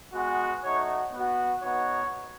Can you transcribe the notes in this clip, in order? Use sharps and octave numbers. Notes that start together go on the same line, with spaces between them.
G#3 B3 F#4
A3 D#4 F#4 C#5
B3 F#4
B3 D#4 F#4 C#5